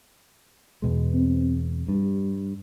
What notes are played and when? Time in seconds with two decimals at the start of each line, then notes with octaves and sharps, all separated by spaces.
0.82 E2 B2 G#3
1.14 C4
1.88 G2 G3